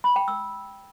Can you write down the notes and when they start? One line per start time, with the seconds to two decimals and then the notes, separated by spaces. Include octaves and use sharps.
0.04 B5
0.16 G5
0.28 E6